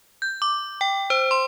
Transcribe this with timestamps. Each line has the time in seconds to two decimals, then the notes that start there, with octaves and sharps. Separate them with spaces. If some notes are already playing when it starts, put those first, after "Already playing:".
0.22 G6
0.42 D6
0.81 G5
1.10 C5
1.31 C6